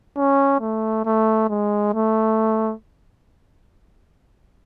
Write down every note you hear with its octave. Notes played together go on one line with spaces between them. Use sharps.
C#4
A3
A3
G#3
A3